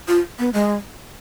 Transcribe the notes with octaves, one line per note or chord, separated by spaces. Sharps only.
F4
B3
G#3